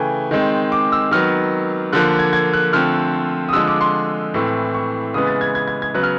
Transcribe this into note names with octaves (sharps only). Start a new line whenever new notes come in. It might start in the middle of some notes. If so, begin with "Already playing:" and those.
Already playing: C#3 E3 A3 G5 G#5
D#3 G#3 C4
D6
E6
D#3 F#3 B3 F6
D3 F3 A#3 F#6
G#6
G#6
F#6
D3 F3 A3 C4 F6
D#6
D3 F3 G#3 E6
D6
C6
A2 E3 A3 C4
C#6
C#3 E3 G#3 B3 D#6
A6
G#6
G#6
G#6
G#6
C#3 F#3 B3 F#6
F6